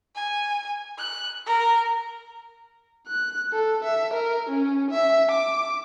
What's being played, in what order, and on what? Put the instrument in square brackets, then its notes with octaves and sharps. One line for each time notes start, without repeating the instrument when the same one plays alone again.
[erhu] G#5
F#6
A#4
[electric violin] F#6
A4
E5
A#4
C#4
E5
D6